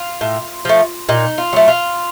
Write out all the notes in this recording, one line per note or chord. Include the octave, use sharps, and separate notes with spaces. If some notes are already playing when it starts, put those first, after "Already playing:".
Already playing: F4
A2
F3 A3
A#2 D#4
F4
F#3 A3
F4